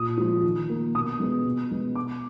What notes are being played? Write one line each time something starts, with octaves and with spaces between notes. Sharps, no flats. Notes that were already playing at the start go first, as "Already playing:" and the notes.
Already playing: A#2 D#6
F3 G#3
D#3
A#3
B2 D#6
G#3 B3
B2
G#3 B3
B2 D6